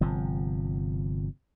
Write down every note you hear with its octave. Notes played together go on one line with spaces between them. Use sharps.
G1 C3 F3